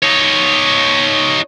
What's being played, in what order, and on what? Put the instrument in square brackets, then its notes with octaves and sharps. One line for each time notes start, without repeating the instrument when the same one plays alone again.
[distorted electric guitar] D#4 C#5